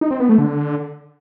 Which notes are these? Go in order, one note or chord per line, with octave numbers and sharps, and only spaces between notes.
D#4
C4
B3
A3
D3